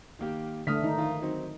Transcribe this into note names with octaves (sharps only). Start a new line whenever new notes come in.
D#3 A#3 G4
D3 A3 D#6 F6 B6
D#3 D#4
D#3 F3 F4
F#3 C4 D#4